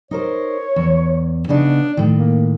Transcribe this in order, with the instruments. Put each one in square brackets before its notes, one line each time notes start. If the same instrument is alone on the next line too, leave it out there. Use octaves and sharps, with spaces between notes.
[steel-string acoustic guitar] D#4 A#4 C5 [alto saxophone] C#5
[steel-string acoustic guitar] E2
[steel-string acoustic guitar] C#3 B3 D#4 [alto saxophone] D4
[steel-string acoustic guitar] A2 D#3
[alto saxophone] A#3